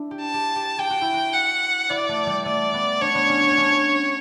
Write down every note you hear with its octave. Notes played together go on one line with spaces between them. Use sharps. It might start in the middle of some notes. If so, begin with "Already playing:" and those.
Already playing: D4 E4
G4
A5
G4
G4
G4 G5
F#4
E4
F#4
F#5
E4 D5
A3
G3
A3 D5
B3
D4 C#5
B3
C#4
C#4
D4
C#4